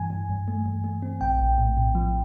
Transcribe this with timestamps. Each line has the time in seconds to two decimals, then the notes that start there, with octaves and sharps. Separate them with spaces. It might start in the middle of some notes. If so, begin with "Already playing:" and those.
Already playing: G2 E3 G#5
0.10 G2
0.29 G2
0.48 A3
0.66 G2
0.84 A3
1.02 C4
1.21 A#1 G5
1.40 A#1
1.58 A2
1.77 A2
1.95 F3